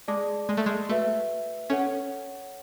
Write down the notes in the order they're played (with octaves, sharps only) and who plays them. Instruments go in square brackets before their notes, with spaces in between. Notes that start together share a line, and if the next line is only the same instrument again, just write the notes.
[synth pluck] G#3 [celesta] G#4 D5 A5 D6
[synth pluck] G#3
A3
G#3
[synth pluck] A3 [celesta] F#4 B4 E5
[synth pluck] C#4 [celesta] A4 C#5 F#5